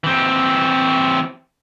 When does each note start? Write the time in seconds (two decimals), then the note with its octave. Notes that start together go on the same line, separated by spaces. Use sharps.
0.04 E3 C4